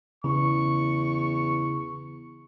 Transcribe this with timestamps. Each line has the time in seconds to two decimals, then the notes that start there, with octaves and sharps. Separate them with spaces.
0.24 E2 C#3 C#6